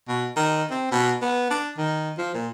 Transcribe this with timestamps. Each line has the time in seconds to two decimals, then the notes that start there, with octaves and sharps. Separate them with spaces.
0.08 B2
0.36 D#3
0.71 C4
0.92 B2
1.22 B3
1.50 D4
1.77 D#3
2.18 F3
2.34 A#2